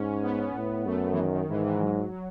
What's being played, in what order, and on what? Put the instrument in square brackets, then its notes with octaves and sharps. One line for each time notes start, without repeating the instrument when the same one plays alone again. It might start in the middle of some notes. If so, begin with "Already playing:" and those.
Already playing: [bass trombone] G#2 [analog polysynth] C#4
[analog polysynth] B3
[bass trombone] A2
[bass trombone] F#2 [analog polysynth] A3
[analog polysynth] E3
D#3
D#3
[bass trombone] G#2 [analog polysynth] E3
[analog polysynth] E3
F#3
F#3